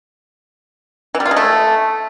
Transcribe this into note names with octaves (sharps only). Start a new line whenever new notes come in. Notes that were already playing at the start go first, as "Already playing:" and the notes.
E3
G3
F4
G#3
A3